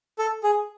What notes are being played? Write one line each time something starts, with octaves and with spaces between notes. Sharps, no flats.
A4
G#4